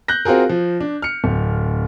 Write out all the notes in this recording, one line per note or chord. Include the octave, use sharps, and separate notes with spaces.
F#6 G6 A#6
C4 F4 F#4 G#4 A#4
F3
D4
F6 C#7
D1